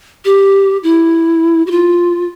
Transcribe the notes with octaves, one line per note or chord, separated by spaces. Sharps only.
G4
E4
F#4
F4